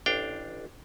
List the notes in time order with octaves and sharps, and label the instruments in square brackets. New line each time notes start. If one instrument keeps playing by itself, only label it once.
[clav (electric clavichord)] A1 D4 F5 G5